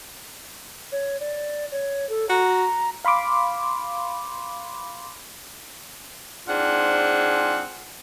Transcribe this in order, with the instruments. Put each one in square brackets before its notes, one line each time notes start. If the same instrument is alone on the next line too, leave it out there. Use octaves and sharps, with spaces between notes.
[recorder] C#5
D5
C#5
A4
[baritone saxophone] F#4 [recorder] A#5
[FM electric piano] F5 B5 C6 D6
[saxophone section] G#2 C4 D4 F4 G#4 F#5